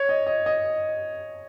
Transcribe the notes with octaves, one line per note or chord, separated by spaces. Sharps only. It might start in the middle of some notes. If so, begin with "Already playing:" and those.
Already playing: C#5
D#5
D#5
D#5